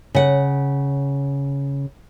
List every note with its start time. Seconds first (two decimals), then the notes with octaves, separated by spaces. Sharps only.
0.15 C#3 F#5